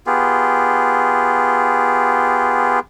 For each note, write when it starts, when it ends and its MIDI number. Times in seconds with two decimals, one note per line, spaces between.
0.07 2.79 59
0.07 2.79 65
0.07 2.79 67
0.07 2.79 68